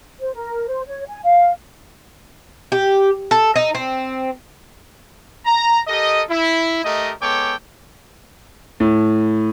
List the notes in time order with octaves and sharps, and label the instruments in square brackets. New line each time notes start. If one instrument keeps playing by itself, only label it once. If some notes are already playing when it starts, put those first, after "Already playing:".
[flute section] C5
A#4
C5
C#5
G#5
F5
[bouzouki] G4
A4
D#4
C4
[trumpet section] A#5
G4 A4 A#4 D#5
E4
A3 G4 A#4 D#5
G#3 B3 A4 C#5 G5 D6
[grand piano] A2